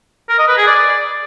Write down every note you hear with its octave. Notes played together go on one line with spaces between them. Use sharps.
A#4
D#5
B4
G#4
D5